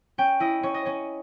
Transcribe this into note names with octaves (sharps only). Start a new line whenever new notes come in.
C#4 G5
E4 D#5
C#4 C#5
D#5
C#4 C#5